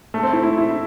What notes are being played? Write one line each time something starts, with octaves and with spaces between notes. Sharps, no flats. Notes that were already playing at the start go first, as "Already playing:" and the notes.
A3
C4
E4
E4
E4